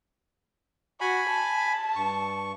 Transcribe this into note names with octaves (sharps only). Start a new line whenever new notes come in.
F#4 G#5 B5
A5
G2 C#6